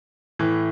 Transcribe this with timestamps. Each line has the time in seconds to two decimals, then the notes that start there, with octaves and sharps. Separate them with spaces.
0.39 A2 E3